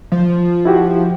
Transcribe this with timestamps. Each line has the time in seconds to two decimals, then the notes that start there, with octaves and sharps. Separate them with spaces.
0.12 F3
0.65 E4 F#4 G4